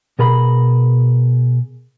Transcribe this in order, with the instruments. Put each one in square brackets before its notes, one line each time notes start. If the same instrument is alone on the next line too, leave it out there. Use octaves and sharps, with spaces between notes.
[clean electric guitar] B2 G#4 A#4 A#5 B5